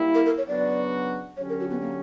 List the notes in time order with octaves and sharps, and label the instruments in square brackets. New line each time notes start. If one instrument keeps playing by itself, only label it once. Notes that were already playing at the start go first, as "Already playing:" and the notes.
Already playing: [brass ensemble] G3 A#3 E4
[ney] A#4
A#4
C#5
[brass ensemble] C#3 F#3 B3 D4 F#4 [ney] D5
[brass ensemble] D3 F#3 C#4 G4 [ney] C#5
[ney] A#4
F#4
B3
A#3